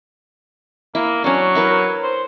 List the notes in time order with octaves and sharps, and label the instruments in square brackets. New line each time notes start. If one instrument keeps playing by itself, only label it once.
[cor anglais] A#3 [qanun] E4
[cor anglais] F#3 [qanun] C#4 D4
[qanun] E4 A#4 B4
[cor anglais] C5